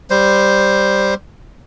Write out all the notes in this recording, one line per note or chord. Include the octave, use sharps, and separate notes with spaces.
G3 C5